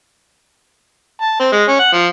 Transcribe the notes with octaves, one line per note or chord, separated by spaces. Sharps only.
A5
C4
G#3
C#4
F#5
F3